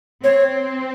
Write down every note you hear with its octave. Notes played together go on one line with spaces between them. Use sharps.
C4 C#5